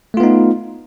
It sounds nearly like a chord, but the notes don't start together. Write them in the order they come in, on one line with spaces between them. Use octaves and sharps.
A3 F4 B3 D#4